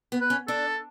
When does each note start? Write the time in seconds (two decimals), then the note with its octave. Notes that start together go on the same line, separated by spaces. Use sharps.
0.12 B3
0.21 B4
0.30 C#4
0.48 D4 A4